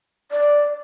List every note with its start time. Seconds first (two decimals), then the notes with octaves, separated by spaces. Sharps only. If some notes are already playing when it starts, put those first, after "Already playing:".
0.32 D5